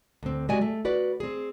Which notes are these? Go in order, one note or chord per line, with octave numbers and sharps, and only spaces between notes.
D2 C4
G#3 F#4 G4 D5 G#5
A3
F#4 B4 D5
C4 G#4